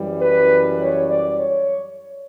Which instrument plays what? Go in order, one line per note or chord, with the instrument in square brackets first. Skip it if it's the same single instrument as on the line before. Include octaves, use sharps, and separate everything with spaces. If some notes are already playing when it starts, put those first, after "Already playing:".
Already playing: [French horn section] F#2 E3 G3
B4
C#5
D5
C#5